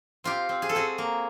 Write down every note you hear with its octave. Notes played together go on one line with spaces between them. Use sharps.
C4 F4 G4
C4
G#4
A4
C4 F#4 G#4
A#3